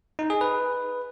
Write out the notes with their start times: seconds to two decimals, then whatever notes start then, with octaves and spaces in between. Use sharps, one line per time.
0.19 D#4
0.30 G#4
0.41 B4